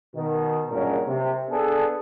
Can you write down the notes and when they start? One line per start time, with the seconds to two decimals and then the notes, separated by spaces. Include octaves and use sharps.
0.15 B2 D#3
0.71 G2 A#2 F#3 G#3 C#4 A#4
1.07 C3
1.50 B3 D4 G#4 A4